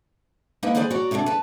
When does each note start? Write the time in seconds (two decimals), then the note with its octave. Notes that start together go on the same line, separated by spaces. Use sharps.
0.63 A#3 D#4 A#4 B4 D#5 F#5
0.75 B3 G#4 B4 C5 D5 G#5
0.91 F#4 A#4 C#5 D5
1.11 C3 F#3 G3 A#3 D4
1.26 B4 A5